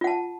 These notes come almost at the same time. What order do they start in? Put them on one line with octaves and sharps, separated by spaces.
F4 F#5 A5